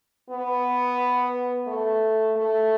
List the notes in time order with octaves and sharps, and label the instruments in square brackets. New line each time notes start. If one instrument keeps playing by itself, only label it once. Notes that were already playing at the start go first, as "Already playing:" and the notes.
[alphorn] B3
A3
A3